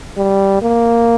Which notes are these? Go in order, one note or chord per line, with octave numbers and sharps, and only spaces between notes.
G3
A#3